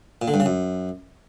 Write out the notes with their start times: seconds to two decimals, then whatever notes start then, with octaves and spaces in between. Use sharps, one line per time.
0.22 A#2
0.28 D3
0.34 G2
0.40 C#3
0.46 F#2